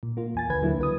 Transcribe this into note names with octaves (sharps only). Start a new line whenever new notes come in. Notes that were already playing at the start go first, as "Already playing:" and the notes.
A#2
A#3 F4
E2 G#5 A6
D#2 D3 B4 G#6
D3 F#3 A#3 E4
C#2 B4 D#6